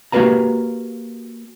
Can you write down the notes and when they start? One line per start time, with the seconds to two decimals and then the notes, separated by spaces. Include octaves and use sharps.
0.12 A#3 F#4 G4 B4 F5 A#5